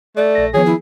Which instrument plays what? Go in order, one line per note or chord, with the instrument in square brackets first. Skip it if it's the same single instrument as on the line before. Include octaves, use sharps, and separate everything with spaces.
[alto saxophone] A3 [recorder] D5
[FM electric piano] A#1 A#6
[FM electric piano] D#3 F3 B3 [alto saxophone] G#4 [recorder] C#5
[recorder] E4